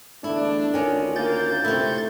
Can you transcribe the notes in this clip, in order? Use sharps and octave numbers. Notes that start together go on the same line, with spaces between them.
E2 D3 A3 D4 E4
D2 D#3 C#4 F4
A#3 G6 A6
C3 A3 E4